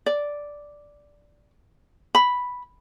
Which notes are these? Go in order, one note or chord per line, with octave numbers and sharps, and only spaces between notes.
D5
B5